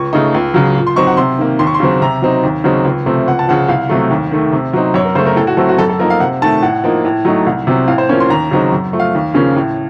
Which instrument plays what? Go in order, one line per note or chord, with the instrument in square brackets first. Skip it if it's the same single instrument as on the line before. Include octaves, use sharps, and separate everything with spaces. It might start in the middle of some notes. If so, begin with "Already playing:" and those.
Already playing: [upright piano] C#2 C#6
C#3 A3 D#4
C#2
C#3 F#3
A#2
C6
F#3 C4 D#4 C#6
F#5
C3 C6
D#3 A#3
D#2 C6
C#6
C6
C#3 F#3 C4
C3 A#5
F#3 C4 D#4
D#2
C#3 F#3 C4 D#4
C#2
C3 F3 A3 C4
C#2 F#5
A5
C#3 F3 F#5
C2 F5
C3 F#3 A3
D#2
D#3 A3
C3
F#3 C4 D#4
F#2 C#5
A#4
C#3 C5
A3
A#4
A2 A4
F#4
F#3 A3 C4 A4
F#4
F#2 A4
A4
F3 A#3 D#4 A#4
F5
C3 F#5
D#3 A3 A5
A2 F#5
F3 A#3 D#4
A2
F#3 A3 D#4
C2
C3 F#3 C4
A2 F5
C5
F3 A#3 C#4 C#5
C6
D#2 A#5
C#3 F#3 C4 D#4
F#2
F3 A3
F5
D#2
C#3 F3 A#3 C#4
A2